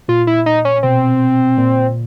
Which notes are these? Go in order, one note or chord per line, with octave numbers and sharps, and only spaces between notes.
A#2 F4
E4
D#4
C#4
B2 C4
A#2